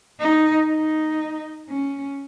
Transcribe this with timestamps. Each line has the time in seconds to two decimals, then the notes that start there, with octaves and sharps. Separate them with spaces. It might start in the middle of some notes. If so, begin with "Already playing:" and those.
0.20 D#4
0.70 D#4
1.69 C#4